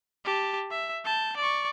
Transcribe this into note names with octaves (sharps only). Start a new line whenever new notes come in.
G4 A5
E5
A5 G6
D5 C#6